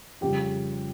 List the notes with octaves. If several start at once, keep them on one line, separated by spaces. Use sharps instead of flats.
F2 C#3 G3 G4